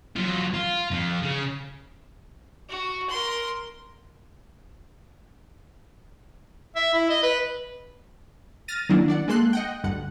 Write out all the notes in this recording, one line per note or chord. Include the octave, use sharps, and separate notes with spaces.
F#3 F4
F4
F2 F3
C#3
F#4
A#4 C6
E5
E4
D#5
B4
F6 A6 A#6 D#7
D#3 F#3 A#3 D4 E4
D4 D5 F#5
G#3 A#3 A4 C6 F#6
D#5 F#5 G5
D2 G2 F#5